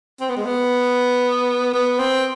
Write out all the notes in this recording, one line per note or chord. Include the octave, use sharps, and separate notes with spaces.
C4
B3
G#3
B3
B3
C4